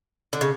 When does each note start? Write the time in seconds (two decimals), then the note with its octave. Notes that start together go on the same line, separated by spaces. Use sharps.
0.33 D3
0.41 C#3